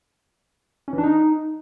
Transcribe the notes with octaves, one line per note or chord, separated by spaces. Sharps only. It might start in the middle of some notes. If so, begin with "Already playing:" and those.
C#4
E3
D4
D#4